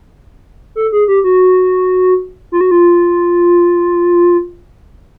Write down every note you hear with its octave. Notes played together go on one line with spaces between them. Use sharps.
A4
G#4
G4
F#4
F4
F#4
F4